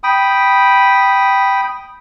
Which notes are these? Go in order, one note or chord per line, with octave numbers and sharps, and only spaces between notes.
G5 B5 D#6